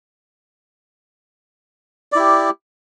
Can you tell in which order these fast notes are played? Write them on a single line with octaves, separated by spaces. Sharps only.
D5 E4 G4